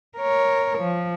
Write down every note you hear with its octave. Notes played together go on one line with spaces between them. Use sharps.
A#4 C#5
F3